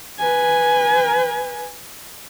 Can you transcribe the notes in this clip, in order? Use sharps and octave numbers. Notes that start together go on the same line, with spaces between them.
B4 G#5